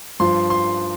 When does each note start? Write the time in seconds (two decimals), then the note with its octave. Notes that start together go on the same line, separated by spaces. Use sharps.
0.20 G2 F3 C6
0.50 C6